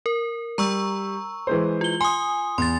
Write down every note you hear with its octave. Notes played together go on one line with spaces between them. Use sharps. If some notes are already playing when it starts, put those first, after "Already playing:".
A#4
G3 A#5 C#6 E6
E3 G#3 C5
F4 G7
G#5 C6 D#6
E2 C6 A6